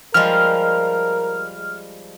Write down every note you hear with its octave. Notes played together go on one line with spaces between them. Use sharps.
F3 G3 G#3 A#4 F6